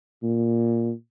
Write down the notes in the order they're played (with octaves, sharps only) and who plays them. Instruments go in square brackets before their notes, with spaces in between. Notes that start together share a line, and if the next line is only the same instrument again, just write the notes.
[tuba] A#2